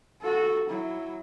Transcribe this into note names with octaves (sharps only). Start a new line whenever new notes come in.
F#4 A4
F#3 E4